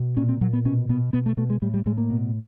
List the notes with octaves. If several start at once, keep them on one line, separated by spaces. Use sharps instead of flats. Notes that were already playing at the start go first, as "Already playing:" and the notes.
Already playing: B2
A#2 C#4
C4
A#2 F#3
B3
B2 C#4
B2 B3
B2 B3
A3
B2 A3
G#3
A2 G3
G3
A2 G#3
A#3
B2